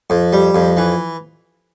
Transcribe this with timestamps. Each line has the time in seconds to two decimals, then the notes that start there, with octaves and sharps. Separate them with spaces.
0.10 F2
0.33 G3
0.55 F2
0.77 E3